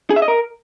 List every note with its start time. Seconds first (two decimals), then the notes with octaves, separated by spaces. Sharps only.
0.10 G#4
0.16 E5
0.22 D#5
0.28 A#4